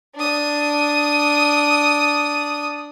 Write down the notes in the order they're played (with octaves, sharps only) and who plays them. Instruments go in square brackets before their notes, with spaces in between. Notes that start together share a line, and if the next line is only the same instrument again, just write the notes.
[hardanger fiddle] D4 D#6